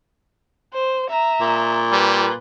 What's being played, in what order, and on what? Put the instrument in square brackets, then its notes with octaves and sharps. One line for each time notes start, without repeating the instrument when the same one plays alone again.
[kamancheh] C5
E5 A#5
[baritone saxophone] A#2
[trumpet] G3 [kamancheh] B4